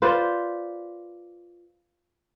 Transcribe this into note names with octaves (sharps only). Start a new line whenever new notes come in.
F4 B4 C5 D5